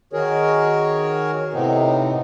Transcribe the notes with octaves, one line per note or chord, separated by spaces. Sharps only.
D#3 F#4 G#4 A#4 C#5
A2 C3 B3 C4 D#4